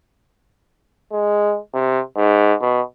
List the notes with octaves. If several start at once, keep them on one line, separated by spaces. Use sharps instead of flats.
G#3
C3
G#2
B2